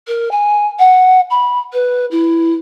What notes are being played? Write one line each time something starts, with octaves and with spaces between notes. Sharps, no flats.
A#4
G#5
F#5
B5
B4
E4